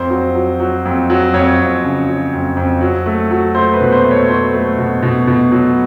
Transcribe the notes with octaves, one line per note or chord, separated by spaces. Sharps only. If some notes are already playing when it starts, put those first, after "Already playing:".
Already playing: F2 C5
F#3
F#3
F#3
F2
F#3
F2 C#5
F2
C#3
F#3
F2
F2
F#3
A3
F#3
A3 C5
B4
B2
C5
A3
C#5
F#3 C5
A3
B2
B2
B2
F#3